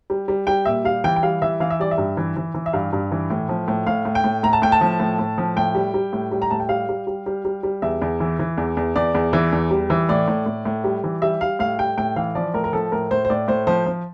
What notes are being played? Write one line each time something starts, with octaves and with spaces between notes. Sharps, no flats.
G3
G3
G3 G5
A#2 E5
G3 F5
E3 G5
G5
G3 F5
E3 E5
E3 F5
E5
G3 D5
E5
G2
E3
E3
E3
E5
G2 F5
G2
E3
A2
F3
A2
A2 F5
A2
G5
A2
A2 A#5
A5
A2 G5
A5
F3
A2
A2
F3
A2 G5
G3
G3
A2
G3
A#5
A2 A5
G5
G3 F5
G3
G3
G3
G3
G3
E2 E5
E2
E3
E3
E2
E2
E2 D5
E2
E3
E2
G3
E3
A2 D5
A2
A2
A2
G3
E3
G3 E5
G3 F5
A2 F5
G3 G5
A2 G5
E3 F5
F3 D5
A2 A#4
A#4
F3 A4
A2 A#4
A2 C5
C5
A2 D5
A2 C5
F3 C5
F3